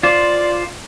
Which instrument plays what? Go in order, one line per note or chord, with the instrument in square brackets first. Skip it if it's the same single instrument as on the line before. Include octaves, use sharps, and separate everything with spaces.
[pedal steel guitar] F4 C5 [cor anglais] D5